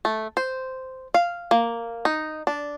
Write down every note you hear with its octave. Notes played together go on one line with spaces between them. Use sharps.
A3
C5
F5
A#3
D#4
D4